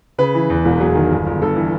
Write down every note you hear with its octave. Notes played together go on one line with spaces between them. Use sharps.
C#3 B4
E3
E2
E1
F#3 G#4
D#3
G1
G1
G2 A4
E3